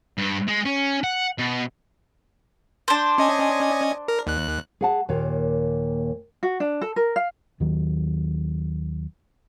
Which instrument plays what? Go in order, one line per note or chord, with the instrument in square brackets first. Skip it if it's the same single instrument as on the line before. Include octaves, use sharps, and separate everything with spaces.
[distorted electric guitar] G2
G#3
C#4
F#5
B2
[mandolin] D4 C5
[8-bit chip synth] C#4 D#5 G#5
A#4
D#2 F#6
[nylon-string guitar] G#4 F#5 A5
D#2 A#2 A#3 C#5
[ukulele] F#4
D4
A4
A#4
F5
[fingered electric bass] D#2 D#3 F#3